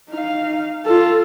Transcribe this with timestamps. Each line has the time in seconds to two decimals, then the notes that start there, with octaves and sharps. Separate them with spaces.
0.11 D#4 F5
0.85 F4 A4